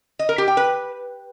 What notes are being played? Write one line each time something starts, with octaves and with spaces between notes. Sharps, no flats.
D#5
A#4
G4
G5
B4